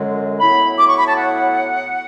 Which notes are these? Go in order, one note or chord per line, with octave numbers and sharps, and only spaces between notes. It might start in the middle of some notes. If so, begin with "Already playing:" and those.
Already playing: F#2 D3 G#3
A2 F#3 B3 E4 B5
D6
C#6
B5
A5
F#5